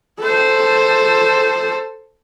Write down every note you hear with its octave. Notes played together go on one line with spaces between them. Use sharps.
A4 C5